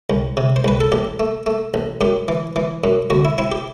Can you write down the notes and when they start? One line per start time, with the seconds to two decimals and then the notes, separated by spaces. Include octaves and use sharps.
0.10 C2
0.37 C3
0.56 C5
0.64 C2 B4
0.81 A4
0.92 A1 G4
1.20 A3
1.46 A3
1.74 A1
2.01 F#2 G4
2.28 E3
2.56 E3
2.84 F#2
3.10 D2 F#4
3.25 E4
3.38 C4 E4
3.52 G4